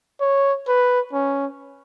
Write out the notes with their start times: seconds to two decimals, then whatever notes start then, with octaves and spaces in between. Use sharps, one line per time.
0.21 C#5
0.67 B4
1.13 C#4